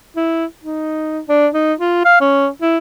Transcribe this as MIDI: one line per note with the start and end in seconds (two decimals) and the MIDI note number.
0.16 0.46 64
0.64 1.20 63
1.29 1.48 62
1.54 1.74 63
1.79 2.04 65
2.05 2.20 77
2.21 2.48 61
2.62 2.78 64